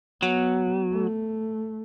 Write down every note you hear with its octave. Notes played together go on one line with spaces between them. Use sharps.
F#3 B3
A3